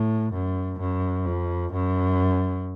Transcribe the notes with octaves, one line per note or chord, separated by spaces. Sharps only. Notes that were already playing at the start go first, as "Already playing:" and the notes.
Already playing: A2
F#2
F#2
F2
F#2